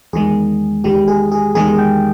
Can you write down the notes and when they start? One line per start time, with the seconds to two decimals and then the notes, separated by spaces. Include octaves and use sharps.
0.13 E2 D#3 G#3 G#4
0.84 E2 D#3 G#3 G4
1.08 G#4
1.32 G#4
1.55 E2 D#3 G#3 G#4
1.78 G5